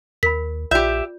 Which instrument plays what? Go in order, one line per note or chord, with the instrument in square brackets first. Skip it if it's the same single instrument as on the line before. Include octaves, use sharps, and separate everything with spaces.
[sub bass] D#2 [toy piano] A#4 B5 [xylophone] B6
[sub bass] A#1 [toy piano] F4 D5 [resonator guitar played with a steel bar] G4 E5 [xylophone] G6